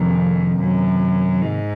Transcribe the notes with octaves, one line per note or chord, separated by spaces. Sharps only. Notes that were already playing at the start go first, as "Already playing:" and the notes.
Already playing: F2 C3 D#3 A#3
F#2
G#2